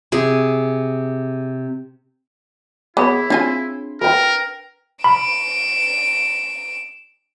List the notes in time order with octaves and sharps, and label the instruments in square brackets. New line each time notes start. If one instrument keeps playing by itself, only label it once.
[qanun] C3 G#4
[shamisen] B3 [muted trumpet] E4 [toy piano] G#4 C#5 B5
[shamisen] C4 F4 G#5 [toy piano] D4 [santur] C6
[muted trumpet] A#4 [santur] B4 G5
[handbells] B5 [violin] D7 E7